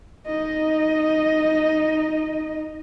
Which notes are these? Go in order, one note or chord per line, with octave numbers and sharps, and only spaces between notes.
D#4 D#5